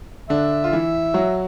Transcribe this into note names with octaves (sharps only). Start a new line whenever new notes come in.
D3 D4 E5
F4
E3 E4
F#3 F#4